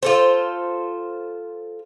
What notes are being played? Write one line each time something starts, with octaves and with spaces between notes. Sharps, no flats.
F4 A4 C5